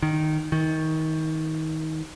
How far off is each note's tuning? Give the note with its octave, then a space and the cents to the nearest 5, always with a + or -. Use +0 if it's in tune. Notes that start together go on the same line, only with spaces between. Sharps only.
D#3 -5
D#3 +25